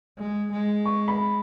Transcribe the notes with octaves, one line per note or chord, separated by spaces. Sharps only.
G#3
G#3
C#6
B5